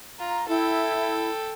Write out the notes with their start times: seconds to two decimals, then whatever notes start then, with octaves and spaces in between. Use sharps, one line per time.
0.19 F4 A#5
0.48 E4 A4 G5